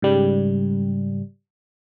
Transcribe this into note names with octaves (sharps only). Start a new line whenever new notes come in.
G#2 C#3 G3